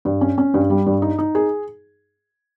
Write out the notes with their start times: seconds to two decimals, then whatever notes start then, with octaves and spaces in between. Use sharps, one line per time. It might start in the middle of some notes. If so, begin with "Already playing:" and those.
0.05 G2
0.21 C#4
0.38 C#4
0.54 G2
0.70 G3
0.86 G2
1.02 D#4
1.18 D#4
1.35 G#4